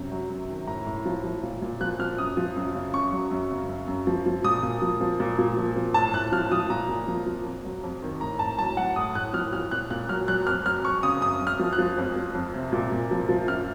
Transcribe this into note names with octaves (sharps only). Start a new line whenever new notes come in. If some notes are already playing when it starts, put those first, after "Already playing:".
Already playing: F#2 C3
F#3
F#2
D#3
A2 A#5
A2
F3
F3
A#2
A#2
F3 F#6
F3 F6
F#2 D#6
F3
F#2
C#3
F#2 C#6
F#3
F#2
C#3
F#2
F#2
F3
F3
A#2 D#6
A#2
F3
F3
A#2
A#2
F3
F3
A2 A5
A2 F#6
F3 F6
F3 D#6
A#2 A#5
A#2
F3
F3
F2
F#3
F2
D#3
A2 A#5
A2 A5
F#3 A5
F#3 F#5
A2 D#6
A2 F#6
F3 F6
F3 F6
A#2 F#6
A#2 F#6
F#3 F6
F#3 F#6
F2 F6
F#3 F6
F2 C#6
C#3 D#6
F#2 D#6
F#2
F6
F3
F#6
F3
F2
F3
F2
C3
A#2
A#2
F3
F3
F#2 F6